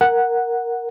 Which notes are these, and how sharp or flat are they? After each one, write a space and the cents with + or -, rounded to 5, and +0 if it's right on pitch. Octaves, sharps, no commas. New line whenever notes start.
A#4 +0 F#5 +0